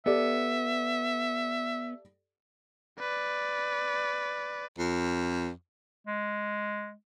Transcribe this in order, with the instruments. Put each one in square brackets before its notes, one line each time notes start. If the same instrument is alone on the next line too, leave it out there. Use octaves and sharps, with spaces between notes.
[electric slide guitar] B3 [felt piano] G4 A4 D5 [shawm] E5
[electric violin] B4 D5
[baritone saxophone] F2
[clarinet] G#3